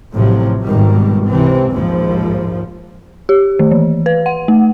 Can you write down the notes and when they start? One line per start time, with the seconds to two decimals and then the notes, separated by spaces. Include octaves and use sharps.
0.13 A1 A2 C3 F3 F#3
0.65 G#1 B2 D#3 G3
1.27 C#2 C3 E3 C4
1.70 A#1 D#2 G#2 F3
3.29 G4
3.59 D#3
3.71 E3
4.06 B4
4.26 F#5
4.48 A3